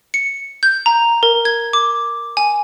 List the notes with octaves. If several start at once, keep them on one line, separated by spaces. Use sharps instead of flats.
C#7
G6
A#5
A#4
G#6
D6
G#5